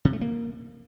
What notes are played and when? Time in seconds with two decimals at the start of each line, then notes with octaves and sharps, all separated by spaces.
0.05 C3
0.13 A3
0.21 A#3